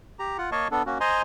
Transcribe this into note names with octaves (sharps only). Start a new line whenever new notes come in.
G4 A#5
F4 F#5
A#3 C#5 D#5 F5 A5 C#6
B3 D4 A4
A#3 C#4 F#4
C5 D#5 G#5 A#5 C6